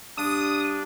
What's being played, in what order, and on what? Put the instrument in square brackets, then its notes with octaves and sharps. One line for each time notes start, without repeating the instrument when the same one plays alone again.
[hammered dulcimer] G2 [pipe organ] D4 [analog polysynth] D#6